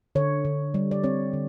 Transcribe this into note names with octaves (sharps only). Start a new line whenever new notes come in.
D3 C#5
D3
G3
D5
C4 C#5
D3